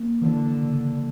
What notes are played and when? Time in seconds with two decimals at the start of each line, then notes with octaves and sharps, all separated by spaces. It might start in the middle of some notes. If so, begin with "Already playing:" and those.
Already playing: A#3
0.22 D3 E3
0.62 C#3